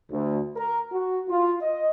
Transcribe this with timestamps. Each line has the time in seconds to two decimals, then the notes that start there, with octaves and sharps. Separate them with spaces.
0.10 D2
0.56 A#4
0.92 F#4
1.29 F4
1.62 D#5